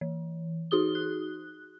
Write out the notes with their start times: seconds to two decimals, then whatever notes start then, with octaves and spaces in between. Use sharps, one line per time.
0.01 E3
0.71 D#4 F#4 G#4 D#6 G7
0.95 F#6